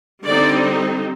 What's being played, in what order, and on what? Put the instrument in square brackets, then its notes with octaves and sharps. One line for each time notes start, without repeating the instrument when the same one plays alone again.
[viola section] D3 G3 C4 D#4 D5